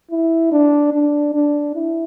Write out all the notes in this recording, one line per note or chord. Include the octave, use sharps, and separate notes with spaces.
E4
D4
D4
D4
E4